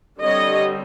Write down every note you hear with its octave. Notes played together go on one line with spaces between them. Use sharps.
D3 G3 C4 C#5 D#5